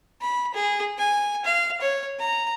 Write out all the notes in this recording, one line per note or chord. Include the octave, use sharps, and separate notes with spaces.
B5
G#4
G#5
F5
C#5
A#5